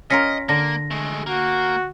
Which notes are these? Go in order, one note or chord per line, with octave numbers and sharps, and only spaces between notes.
C#4 F4 A#4 D#5 A#6 B6 C#7
D3 A#3 A#6
G#3 A3
A#3 F#4